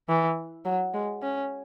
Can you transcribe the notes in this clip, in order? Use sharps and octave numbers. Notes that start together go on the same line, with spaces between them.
E3
F#3
G#3
C#4